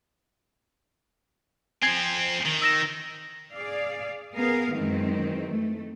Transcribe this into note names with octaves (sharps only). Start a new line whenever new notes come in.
F3 C4 G#5 G#6 C7
D#3
E6 A#6 E7
G#4 D5 F5
B3 G#4 A#4 F5
F#2 D#3 E3 G#3 C4
A3